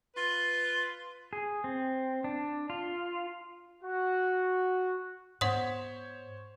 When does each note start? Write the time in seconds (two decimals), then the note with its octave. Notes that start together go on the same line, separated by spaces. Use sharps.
0.16 F4 B4
1.33 G#4
1.64 C4
2.24 D4
2.70 F4
3.83 F#4
5.41 G#2 B3 C5 C#5 F#5 C6 D#6